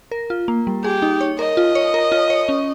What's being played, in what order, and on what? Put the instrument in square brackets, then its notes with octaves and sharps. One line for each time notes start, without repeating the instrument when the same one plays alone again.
[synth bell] A#4
F4
A#3
G3
[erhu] G4 [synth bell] G#4
[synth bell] D#4
C#5
[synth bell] A#4 [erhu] D#5
[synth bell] F4
C#5
A#4
F4
C#5
C#4